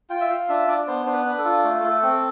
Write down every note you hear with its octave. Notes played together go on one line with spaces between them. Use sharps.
F4 G5
E5
F4 F5
D4 E5
D4 D5
D5
B3 C5
D4 C5
B4
D4
A4
F4
A3
A3
C4